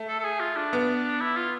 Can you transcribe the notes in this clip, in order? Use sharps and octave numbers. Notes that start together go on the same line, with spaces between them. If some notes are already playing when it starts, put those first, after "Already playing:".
Already playing: A3
A4
A4
G#4
F4
D4
B3
E4
F4